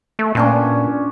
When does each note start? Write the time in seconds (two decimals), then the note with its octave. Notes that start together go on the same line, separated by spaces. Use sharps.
0.19 A3
0.35 A#2 C#4 D4 C6